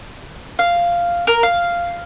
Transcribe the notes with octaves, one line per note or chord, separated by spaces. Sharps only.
F5
A#4
F5